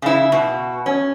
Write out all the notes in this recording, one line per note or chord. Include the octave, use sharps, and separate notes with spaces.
C#3 E4
B2
C#4